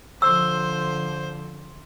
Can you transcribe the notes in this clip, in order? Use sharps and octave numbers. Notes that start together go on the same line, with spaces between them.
D3 F3 C5 E6